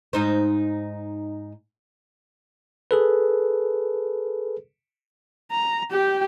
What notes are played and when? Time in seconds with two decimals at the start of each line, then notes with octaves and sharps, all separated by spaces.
0.13 G#2 D#4 C5
2.91 G#4 A4 B4
5.52 A#5
5.91 G4 G5